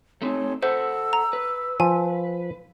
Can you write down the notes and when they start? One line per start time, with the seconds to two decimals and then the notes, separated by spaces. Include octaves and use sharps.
0.22 A3 C4 D#4 C#5
0.63 A4 C5 E5 F#5 E6
1.13 A#5
1.33 B4
1.80 F3 G#5